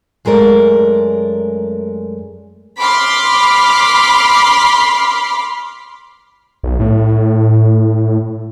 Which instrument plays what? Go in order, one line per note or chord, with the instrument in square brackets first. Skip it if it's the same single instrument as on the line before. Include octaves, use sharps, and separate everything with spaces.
[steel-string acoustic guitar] F#2 G#3 A3 A#4 D5
[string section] B5 C6 D6 F6
[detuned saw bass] B1
A2